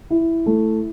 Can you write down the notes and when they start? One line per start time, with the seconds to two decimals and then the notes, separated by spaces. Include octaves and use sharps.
0.10 E4
0.46 A3